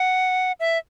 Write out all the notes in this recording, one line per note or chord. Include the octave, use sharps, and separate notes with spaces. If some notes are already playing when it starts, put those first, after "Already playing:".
Already playing: F#5
E5